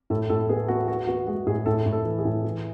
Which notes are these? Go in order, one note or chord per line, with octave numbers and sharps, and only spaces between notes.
A2 A4
A2 A4
B3 G#4
B3 F#4
B3 F#4
B3 F#4
G#3 F#4
A2 G#4
A2 A4
A2
A4
E3
G#4
A2
E3